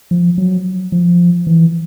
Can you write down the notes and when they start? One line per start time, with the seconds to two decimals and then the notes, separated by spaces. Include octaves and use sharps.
0.11 F3
0.38 F#3
0.92 F3
1.47 E3